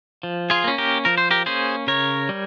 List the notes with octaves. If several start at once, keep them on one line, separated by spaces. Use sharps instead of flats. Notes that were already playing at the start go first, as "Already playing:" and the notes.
F3
F4 G#4
A#3 C#4
G4 A#4
F3 A#4
C5
G4 A#4
A#3 C#4 G#4 C5
C#3 A#4 C#5
G3